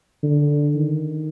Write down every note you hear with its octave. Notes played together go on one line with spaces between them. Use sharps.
D3
D#3